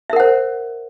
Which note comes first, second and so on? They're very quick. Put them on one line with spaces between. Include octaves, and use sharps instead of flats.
E5 A#4 F#5 C5